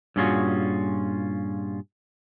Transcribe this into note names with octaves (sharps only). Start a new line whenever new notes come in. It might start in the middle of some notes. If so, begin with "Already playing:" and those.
G2 A#2 C#4 F4 F#4 G#4